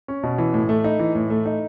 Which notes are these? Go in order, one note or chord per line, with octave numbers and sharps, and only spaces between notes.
C#4
B2
E3
A2
A3
D#4
E3
A2
A3
D#4